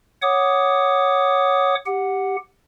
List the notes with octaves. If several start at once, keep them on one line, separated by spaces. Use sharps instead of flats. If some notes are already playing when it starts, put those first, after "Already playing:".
C#5 F#5 D6 D#6
G4 F#5